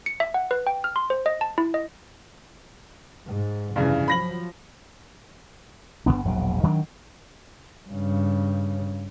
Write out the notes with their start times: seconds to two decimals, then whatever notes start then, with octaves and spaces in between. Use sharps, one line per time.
0.06 C#7
0.20 E5
0.34 F#5
0.51 B4
0.67 G5
0.84 F6
0.96 C6
1.10 C5
1.26 D#5
1.41 A5
1.58 E4
1.74 D#5
3.27 G#2
3.76 F1 G2 C#3 E3
4.08 F3 F#3 B5 A#6 F#7
6.06 G1 A2 B3 D4
6.25 E1 A#1 B2 F#3
6.63 D#3 F#3 C4 D4
7.89 G2 C#3